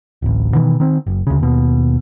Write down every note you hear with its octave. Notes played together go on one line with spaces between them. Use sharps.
D1 A1
B2 D#3 E3
D#3 C4
F#1
D2 C#3
D#2 B2